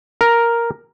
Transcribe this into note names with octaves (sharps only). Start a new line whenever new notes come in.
A#4